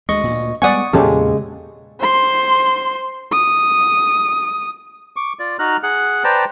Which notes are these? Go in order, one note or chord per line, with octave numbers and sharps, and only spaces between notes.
D2 G#3 D#5 C#6
D2 A#2
G3 G#3 B3 D5 F#5 G#5 C#6 D#6
E2 A#2 C#3 E3 G#3 C#4 G4 A4
C5 C6
D#6
C#6 D6
F4 D5
D#4 F#4 A#5 F6 F#6
G#4 F#5 F#6
B4 C5 D5 G5 A5 A#5